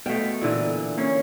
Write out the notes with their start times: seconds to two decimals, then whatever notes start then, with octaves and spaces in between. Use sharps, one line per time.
0.06 B2 A3 F5 G5
0.41 A#2 D3 E3
0.98 A#3 C#4 C#5